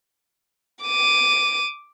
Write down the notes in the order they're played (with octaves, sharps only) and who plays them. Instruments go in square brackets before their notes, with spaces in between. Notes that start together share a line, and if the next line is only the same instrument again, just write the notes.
[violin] D6 D#7